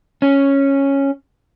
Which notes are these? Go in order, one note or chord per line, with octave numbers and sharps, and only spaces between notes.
C#4